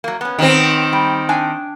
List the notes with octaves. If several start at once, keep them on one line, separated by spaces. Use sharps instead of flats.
F#3 A#3
B3 C#4
D#3 C4
G3
D4 G5 G#5